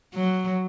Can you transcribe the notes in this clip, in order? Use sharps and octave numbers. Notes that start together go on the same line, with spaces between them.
F#3